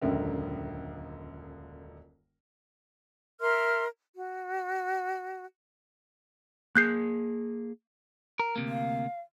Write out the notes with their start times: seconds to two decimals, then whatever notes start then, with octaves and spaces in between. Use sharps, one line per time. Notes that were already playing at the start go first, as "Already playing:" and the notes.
0.02 D#1 C#2 F#2 D3 A#4 E5
3.40 A#4 E5 C6 F6
4.14 F#4
6.75 A#3 G#4 F#6 G6 C7
8.39 A#4
8.56 D2 C3 A#3
8.68 F5